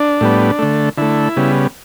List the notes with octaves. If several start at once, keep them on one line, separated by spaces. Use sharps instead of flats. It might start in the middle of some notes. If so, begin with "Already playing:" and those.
Already playing: D4
A2 G3 B3
D3 A3
D3 A3 E4
C#3 G3 B3